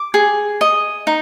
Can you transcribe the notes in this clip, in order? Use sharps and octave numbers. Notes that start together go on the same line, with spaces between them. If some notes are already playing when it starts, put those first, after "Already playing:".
Already playing: D6
G#4
D#5
D#4